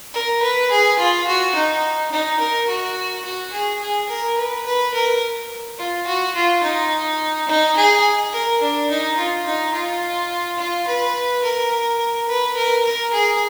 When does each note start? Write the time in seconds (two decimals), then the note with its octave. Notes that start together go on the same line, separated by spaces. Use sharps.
0.14 A#4
0.42 B4
0.71 G#4
0.99 F4
1.27 F#4
1.55 D#4
2.12 D#4
2.40 A#4
2.68 F#4
3.25 F#4
3.53 G#4
3.81 G#4
4.10 A#4
4.38 B4
4.66 B4
4.94 A#4
5.79 F4
6.07 F#4
6.35 F4
6.64 D#4
7.48 D#4
7.77 G#4
8.33 A#4
8.62 D4
8.90 D#4
9.18 F4
9.46 D#4
9.74 F4
10.58 F4
10.87 B4
11.44 A#4
12.28 B4
12.57 A#4
12.85 A#4
13.13 G#4